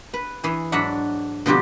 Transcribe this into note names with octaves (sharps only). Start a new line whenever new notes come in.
B4
E3 G#4
G#2 F#3 D4 E5 F#5 B5
B2 D3 F3 G3 C4 G4